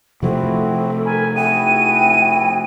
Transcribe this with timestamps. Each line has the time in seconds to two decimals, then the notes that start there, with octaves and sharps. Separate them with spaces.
0.22 C3 F3 A3 C4 E4 F#4 A4
1.05 A#4 G#5 B5
1.35 E4 F#4 G#4 G5 D#7